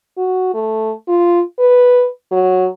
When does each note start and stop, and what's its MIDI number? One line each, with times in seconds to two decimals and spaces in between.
0.18 0.50 66
0.54 0.93 57
1.08 1.42 65
1.59 2.08 71
2.32 2.69 54